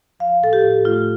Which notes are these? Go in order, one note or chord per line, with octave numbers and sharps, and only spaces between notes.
F3 F5
A2 A4
G4
A2
A3 F4